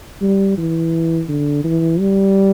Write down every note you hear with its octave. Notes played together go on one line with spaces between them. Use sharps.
G3
E3
D3
E3
G3